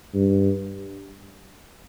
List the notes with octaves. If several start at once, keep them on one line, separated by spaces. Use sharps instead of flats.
G2